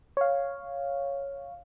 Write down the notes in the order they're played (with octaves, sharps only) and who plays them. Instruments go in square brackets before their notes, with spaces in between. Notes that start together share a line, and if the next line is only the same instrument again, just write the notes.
[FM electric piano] C#5 F5